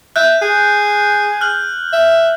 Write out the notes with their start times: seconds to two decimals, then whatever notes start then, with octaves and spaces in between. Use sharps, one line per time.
0.16 E5 F#6 G6
0.42 G#4
1.41 F6 F#6 F#7
1.93 E5